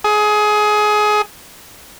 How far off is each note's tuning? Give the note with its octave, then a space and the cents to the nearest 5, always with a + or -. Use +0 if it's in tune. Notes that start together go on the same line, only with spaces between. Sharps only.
G#4 +20